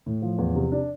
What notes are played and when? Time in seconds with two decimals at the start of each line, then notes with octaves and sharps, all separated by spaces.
0.06 A2
0.22 F3
0.38 E2
0.55 C3
0.72 D4